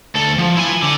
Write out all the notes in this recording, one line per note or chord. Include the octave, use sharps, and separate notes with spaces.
D2 A4
F3
E4 G#5
D3